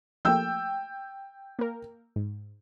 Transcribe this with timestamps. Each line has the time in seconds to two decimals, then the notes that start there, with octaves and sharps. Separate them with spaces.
0.25 F3 A3 A#3 G5 E6 G6
1.59 A#3 A#4
2.16 G#2